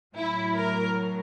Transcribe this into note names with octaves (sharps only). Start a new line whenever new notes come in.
A2 F#3 E4
A#4